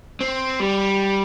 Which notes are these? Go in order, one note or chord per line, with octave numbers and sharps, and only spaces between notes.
C4
G3